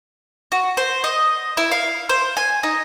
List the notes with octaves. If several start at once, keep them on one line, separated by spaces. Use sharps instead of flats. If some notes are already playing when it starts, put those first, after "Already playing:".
F#4
C5
D#5
E4
F5
C5
G#5
D#4